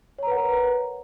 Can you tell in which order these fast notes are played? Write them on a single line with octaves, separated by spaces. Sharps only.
C#5 A#5 B4 F#5 A#4